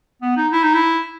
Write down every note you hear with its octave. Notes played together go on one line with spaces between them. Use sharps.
B3
D#4
E4
D#4
E4